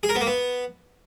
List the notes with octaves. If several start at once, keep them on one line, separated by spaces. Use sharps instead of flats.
G#4
A#4
B3
A#3
B3